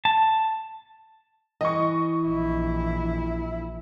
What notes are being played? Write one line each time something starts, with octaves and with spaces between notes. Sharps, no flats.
A5
E3 D#5 C#6
A#1 E4